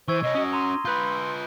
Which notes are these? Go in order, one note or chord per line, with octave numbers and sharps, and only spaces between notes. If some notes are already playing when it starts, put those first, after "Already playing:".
E3 C5 C#6 E6 G#6
C3 C#5 D#5
C#4 F#4 D#6 A#6
A#5 C6 D#7
F4 B4 B5 F#6 G6